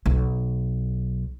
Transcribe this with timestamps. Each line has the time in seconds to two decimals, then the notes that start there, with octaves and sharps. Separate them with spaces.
0.06 B1